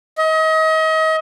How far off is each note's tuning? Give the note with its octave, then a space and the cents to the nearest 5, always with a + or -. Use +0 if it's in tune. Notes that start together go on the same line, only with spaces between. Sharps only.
D#5 +35